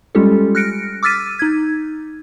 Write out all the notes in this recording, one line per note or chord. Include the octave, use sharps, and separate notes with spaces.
G3 G#3 C#4 F4 G4 A4
F6 F#6 A#6 C#7 D7
D6 E6 F6 A6 B6 D#7
D#4 G#6